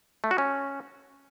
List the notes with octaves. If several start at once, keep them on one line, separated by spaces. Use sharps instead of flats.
A3
F#4
C#4